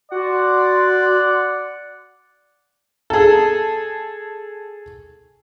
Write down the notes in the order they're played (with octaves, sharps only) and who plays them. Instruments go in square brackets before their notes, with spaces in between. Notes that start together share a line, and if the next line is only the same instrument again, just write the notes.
[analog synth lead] F#4 [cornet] D5 [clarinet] F#5 [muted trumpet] C6
[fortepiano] G#4 A4